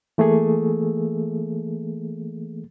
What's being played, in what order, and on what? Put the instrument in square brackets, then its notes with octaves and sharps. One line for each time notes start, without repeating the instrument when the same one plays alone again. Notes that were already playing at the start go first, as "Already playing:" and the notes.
[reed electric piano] E3 A3 A#3 G#4 A4